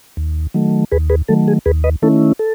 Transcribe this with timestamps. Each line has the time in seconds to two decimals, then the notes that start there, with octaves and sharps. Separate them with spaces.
0.17 D#2
0.54 D#3 F#3 A3
0.92 D#2 G#4 B4
1.10 G#4 B4
1.28 D#3 F#3 A3 A4
1.48 G#4
1.66 D#2 G#4 B4
1.84 B4 D#5
2.02 D#3 A3 C#4 E4 A4
2.39 A4